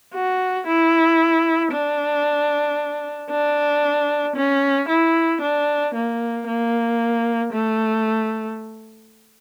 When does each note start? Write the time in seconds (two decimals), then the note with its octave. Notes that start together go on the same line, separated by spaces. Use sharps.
0.14 F#4
0.67 E4
1.72 D4
3.30 D4
4.36 C#4
4.89 E4
5.41 D4
5.95 A#3
6.47 A#3
7.53 A3